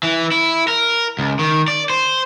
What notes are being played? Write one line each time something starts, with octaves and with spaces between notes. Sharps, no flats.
E3
E4
A#4
C#2
D#3
D5
C5